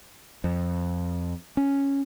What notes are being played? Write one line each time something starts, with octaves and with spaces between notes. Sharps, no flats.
F2
C#4